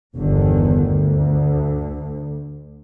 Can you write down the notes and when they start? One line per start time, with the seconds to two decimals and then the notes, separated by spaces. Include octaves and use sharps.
0.16 G1 E2 D3 D#3
0.85 D2